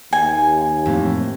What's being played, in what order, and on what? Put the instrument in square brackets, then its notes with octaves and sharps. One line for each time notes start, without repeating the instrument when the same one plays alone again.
[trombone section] D#2 [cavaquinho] G#5
[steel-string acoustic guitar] F2 A2